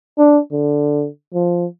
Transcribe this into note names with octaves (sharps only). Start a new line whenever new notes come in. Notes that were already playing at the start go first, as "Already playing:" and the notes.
D4
D3
F3